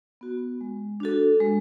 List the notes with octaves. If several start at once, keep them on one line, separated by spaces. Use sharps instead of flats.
B3 F#4
G#3
D4 F#4 A4
G#3